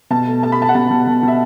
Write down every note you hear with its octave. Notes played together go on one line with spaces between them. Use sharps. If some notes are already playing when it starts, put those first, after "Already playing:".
B2 A5
A3
A3 A5
B5
A3 A5
F#5
B2 A5
B2
B2
B2 E5